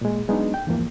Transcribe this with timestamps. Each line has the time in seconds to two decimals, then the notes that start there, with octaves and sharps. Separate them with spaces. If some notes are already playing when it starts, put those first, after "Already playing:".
0.01 A#2 G#3
0.28 F#3 G#3 B3 D4 D#4
0.54 G5
0.67 E2 G#2 E3 F3 A#3